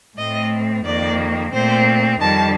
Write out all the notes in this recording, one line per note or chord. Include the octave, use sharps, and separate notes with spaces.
A2 A3 C4 D#5
F2 D#3 A#3 D5
A#2 A3 C4 C5
F2 D#3 G3 A5